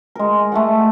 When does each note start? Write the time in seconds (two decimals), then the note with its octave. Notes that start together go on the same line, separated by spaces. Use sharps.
0.15 G#3 A#4
0.52 A3 A4 F#5